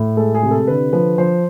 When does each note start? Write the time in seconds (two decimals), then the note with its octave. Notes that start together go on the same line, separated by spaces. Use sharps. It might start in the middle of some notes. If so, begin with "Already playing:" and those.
Already playing: A2
0.17 G#3 A4
0.35 G#4
0.43 C3
0.51 A4
0.67 D3 B4
0.93 F3 B4
1.18 F3 C5